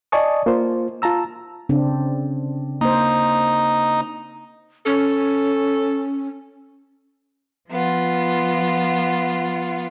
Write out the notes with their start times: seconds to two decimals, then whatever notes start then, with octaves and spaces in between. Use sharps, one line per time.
0.12 D5 D#5 G#5 A5 C#6 D#6
0.46 A#3 F4 C5
1.02 F4 A5 A#5 E6
1.69 C#3 C4 D4
2.81 A#3 D#4 C5
4.86 C#4 A4
7.69 F3 B3 F4